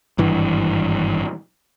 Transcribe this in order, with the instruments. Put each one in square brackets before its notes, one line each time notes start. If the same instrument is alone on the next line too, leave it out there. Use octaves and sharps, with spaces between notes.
[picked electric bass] G#1 G2 E3